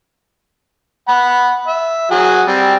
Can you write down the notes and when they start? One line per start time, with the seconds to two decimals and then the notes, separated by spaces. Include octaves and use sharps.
1.08 F#5 B5
1.67 E5
2.11 F#3 G#4 F#5
2.47 G3 C4